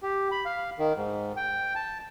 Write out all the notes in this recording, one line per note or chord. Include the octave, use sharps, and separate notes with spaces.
G4
B5
F5
D#3
G#2
G5
A5